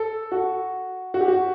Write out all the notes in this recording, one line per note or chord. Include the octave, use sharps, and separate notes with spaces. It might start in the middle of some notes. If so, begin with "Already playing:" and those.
Already playing: A4
F#4
F#4
G4
F#4